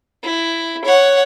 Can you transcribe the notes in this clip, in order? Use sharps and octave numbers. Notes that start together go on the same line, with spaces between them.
E4
C#5 F#5